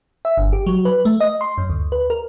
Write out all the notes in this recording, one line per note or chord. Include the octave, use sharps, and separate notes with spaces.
E5
G1
G4
F#3
B4
A3
D#5
C6
F#2
D2
B4
A#4